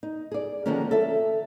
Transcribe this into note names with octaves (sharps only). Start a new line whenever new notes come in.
D#4
G#4 D5
D3 D#3 F3 G#3 A#3 C#4
A4 E5